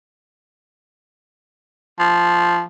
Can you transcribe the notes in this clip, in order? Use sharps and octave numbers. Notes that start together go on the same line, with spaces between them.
F3